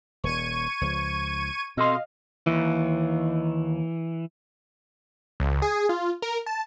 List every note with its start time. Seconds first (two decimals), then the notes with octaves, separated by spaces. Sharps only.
0.24 D#1 C#6 G#6 D#7
0.81 C#2 F3
1.77 B2 C4 A4 D#5 F5 C6
2.46 D#2 E3
5.40 C#2
5.62 G#4
5.89 F4
6.22 A#4
6.46 A5